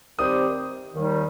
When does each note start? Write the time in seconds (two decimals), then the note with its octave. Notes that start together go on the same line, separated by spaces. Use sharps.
0.18 D#3 G3 C4 G4 C5 D#6
0.95 D#2 D#3 G3 D#4